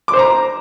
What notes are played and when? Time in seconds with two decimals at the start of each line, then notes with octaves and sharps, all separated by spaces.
0.08 D6
0.13 C5
0.19 A#5